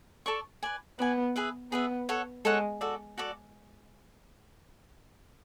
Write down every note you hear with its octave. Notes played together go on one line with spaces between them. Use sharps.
A4 D5 A5 C#6
B4 D5 G#5
B3 B4 D5 G#5
G#4 B4 E5
B3 G#4 B4 E5
A4 C#5 F#5
G#3 A4 C#5 F#5
F#4 A4 D5
F#4 A4 D5